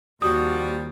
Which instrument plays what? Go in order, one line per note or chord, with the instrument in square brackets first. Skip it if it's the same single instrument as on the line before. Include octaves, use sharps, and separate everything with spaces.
[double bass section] D#2 [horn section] F3 G3 [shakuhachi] F#4 [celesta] D#6